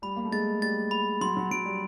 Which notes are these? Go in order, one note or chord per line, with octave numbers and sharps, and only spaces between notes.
G3 B5
A#3
A3
G#3 A6
G3 A6
B5
F#3 C6
F#3
F#3 D7
G3